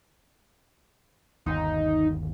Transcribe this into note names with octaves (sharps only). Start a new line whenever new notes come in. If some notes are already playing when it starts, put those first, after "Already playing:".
G1 D#2 D#4